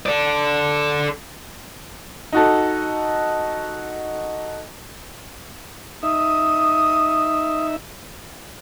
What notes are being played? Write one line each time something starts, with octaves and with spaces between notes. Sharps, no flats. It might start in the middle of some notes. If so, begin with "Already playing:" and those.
A4 D5
D#4 F#4 A4
D#4 E5 D#6